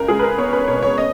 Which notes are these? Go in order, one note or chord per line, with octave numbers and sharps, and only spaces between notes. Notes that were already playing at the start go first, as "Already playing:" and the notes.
Already playing: C#2 A#4
G#3 G#4
B4
A#4
B3 C#5
B4
B2 C#5
C#5
D#5